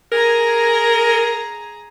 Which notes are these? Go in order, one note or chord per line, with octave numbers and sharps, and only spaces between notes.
G#4 A#4 A#5